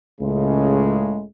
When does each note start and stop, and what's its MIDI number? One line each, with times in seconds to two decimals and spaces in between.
0.21 1.23 37
0.21 1.23 45
0.21 1.23 49
0.21 1.23 56